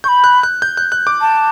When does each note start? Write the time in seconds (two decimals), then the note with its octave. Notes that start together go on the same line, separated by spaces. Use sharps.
0.04 C#6 G6
0.08 B5
0.24 F#6
0.43 F#6
0.62 G6
0.77 F#6
0.92 F#6
1.07 D6
1.21 A5